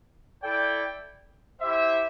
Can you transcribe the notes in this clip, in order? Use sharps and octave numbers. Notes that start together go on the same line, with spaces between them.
E4 A4 D5 G5
E4 G4 C5 E5